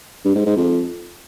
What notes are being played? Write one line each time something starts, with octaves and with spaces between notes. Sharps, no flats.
G2
G#2
G#2
F2